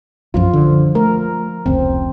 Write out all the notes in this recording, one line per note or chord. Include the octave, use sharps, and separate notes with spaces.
B1 F#2 F3 F4
D3
A3 A#4
F1 C#2 C4